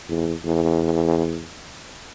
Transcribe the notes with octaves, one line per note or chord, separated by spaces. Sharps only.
E2
E2